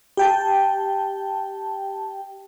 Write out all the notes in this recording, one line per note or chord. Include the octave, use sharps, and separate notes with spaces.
G4 G5 A5